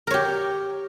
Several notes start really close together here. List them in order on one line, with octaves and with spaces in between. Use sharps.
A#4 C#5 G4